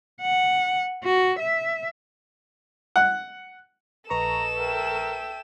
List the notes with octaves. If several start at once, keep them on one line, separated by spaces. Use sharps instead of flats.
F#5
F#4
E5
F#5
A#1 A4 B4 D#5 A#5 C#6 E7
A#4 E5 G5